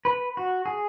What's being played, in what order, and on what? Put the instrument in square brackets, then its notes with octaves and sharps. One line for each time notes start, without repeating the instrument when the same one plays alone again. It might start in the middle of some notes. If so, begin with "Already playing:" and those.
[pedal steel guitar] B4
F#4
G#4